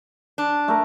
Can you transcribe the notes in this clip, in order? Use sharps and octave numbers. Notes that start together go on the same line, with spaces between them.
D4
A3 A#4